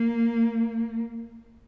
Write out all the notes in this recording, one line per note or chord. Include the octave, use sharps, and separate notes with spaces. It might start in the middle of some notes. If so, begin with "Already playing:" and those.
Already playing: A#3